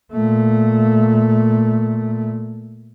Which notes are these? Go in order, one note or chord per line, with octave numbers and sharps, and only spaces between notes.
A#2 A3